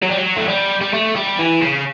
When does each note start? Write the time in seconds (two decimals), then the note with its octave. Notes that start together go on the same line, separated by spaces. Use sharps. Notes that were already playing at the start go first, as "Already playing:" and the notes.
0.03 F#3
0.09 G3
0.17 F#3
0.36 A3
0.48 G3
0.81 G3
0.93 A3
1.16 G3
1.39 E3
1.61 C#3